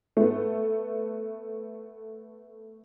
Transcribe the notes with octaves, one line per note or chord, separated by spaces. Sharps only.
A3 B3